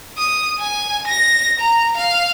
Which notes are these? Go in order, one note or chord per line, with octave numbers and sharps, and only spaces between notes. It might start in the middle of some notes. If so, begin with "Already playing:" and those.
D#6
G#5
A#6
A#5
F5